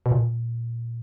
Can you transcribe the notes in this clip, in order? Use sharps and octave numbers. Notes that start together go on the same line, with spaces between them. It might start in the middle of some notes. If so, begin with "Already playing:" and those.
B2
A#2